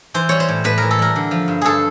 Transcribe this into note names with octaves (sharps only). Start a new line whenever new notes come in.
E3 C5
G3 C#5
C5
A2
A2 B4
E3 A#4
A4
G3 A#4
D3
F3
G2
G2 G#4 A4